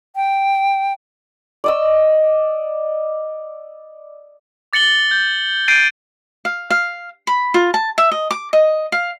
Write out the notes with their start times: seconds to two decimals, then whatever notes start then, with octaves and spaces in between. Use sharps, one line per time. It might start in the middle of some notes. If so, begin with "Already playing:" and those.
0.16 G5
1.64 D5 D#5 E6
4.73 D6 A6 C#7 F#7 G7
5.11 G6
5.68 G6 A6 C7 D7 D#7 G7
6.45 F5
6.70 F5
7.27 B5
7.54 F4
7.74 A5
7.98 E5
8.12 D#5
8.31 D6
8.53 D#5
8.92 F5